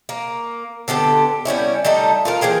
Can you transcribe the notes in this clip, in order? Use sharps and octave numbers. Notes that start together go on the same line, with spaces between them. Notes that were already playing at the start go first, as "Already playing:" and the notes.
A#3
D3 B3 G4 A4
G3 B3 C#4 E4
G3 A3 D#4 A4
F4 A4 A#4
E3 A#3 G#4 G5